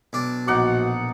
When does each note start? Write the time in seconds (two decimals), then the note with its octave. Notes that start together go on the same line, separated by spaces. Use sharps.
0.13 B1 D4
0.47 A#1 A#2 D#4 F#4 F#5 D6